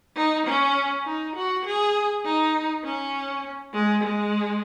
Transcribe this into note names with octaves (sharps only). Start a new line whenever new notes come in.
D#4
C#4
D#4
F#4
G#4
D#4
C#4
G#3
G#3